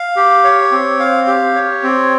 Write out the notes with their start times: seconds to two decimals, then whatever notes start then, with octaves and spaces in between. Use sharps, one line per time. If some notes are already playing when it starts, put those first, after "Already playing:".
Already playing: F5
0.16 G4
0.44 C#5
0.71 C4
1.00 F5
1.27 G4
1.55 C#5
1.83 C4